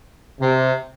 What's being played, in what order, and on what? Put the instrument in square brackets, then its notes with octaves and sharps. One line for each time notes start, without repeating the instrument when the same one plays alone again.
[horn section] C3